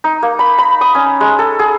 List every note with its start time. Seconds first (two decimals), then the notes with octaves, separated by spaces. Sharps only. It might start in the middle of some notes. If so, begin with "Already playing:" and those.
0.04 D#4
0.22 A#3
0.39 B5
0.58 B5
0.81 D#6
0.95 C#4
1.20 G#3
1.39 A4
1.59 G#4